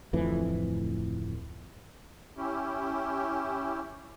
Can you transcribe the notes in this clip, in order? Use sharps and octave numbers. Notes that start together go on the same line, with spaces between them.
D1 F2 A2 E3
C#4 E4 G4